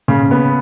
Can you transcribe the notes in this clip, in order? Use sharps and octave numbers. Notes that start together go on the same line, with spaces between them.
C#3
B3